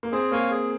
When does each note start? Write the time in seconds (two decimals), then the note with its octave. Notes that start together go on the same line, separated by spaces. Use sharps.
0.03 A#3
0.12 C4 G#4
0.31 A#3 C#5 F5 G#5
0.50 G#4